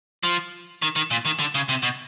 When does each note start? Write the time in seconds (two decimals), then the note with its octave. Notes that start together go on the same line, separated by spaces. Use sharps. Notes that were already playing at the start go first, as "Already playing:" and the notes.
0.23 F3
0.82 D#3
0.96 D#3
1.11 A#2
1.25 D#3
1.40 D3
1.55 C#3
1.69 C3
1.83 B2